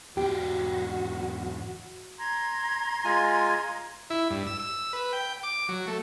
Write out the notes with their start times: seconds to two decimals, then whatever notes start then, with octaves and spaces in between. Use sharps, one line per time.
0.17 E2 G#2 F#4 G4 G5
2.18 A#5 C6 G#6
3.05 G#3 F4 G#5
4.10 E4
4.31 G2
4.47 E6
4.60 E6
4.93 B4
5.13 G5
5.43 D6
5.69 F#3
5.88 A3